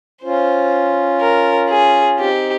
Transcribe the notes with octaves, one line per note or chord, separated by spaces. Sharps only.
C#4 F4 C5
A#4
G#4
C4 D#4 G4